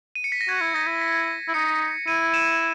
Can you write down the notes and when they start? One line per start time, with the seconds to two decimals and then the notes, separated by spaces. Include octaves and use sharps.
0.15 D#7
0.24 C#7
0.32 B6
0.41 A#6
0.49 F#4 G#6
0.61 E4
0.74 D#4 A#6
0.87 E4
1.02 B6
1.48 E4
1.54 D#4 C#7
2.07 E4 D#7
2.34 E7